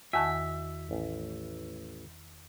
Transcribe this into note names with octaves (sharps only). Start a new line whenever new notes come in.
E2 D#3 F#4 E5 G#5 A5
A1